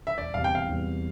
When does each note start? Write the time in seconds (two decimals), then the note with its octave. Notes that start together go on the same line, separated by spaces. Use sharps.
0.07 E5
0.17 E1 D5
0.34 E2 C3 G3 F5
0.44 G5
0.51 E1 F5
0.69 E2 C3 G3